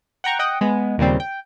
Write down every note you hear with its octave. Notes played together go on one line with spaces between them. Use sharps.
F#5 G5 A#5 C#6
D#5 F#5 G5 D#6
G#3 B3
D#2 A#2 C#3 G3 C4
G5